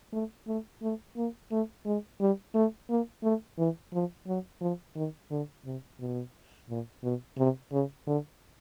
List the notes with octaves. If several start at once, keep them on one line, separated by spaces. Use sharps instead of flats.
A3
A3
A3
A#3
A3
G#3
G3
A3
A#3
A3
E3
F3
F#3
F3
D#3
D3
C3
B2
A#2
B2
C3
C#3
D3